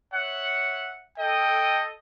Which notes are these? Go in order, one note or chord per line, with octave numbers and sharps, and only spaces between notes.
C#5 E5 F#5
A4 D#5 G5